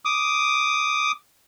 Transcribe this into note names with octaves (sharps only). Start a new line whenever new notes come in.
D6 D#6